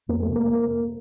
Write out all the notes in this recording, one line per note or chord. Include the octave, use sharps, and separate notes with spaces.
F2 A#3
A3
C3
A#3